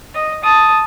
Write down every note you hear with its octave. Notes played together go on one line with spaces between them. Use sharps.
D#5
A5 D#6